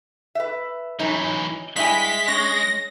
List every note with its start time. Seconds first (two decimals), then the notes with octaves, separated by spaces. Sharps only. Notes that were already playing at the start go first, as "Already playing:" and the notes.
0.35 B4 E5
0.99 E3 F#3 C#4 D#4
1.76 G2 G#3 E4 G#5 B6
2.28 C#4 A#6